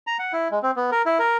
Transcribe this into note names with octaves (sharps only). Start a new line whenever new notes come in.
A#5
F#5
E4
G#3
C4
B3
A#4
E4
A#4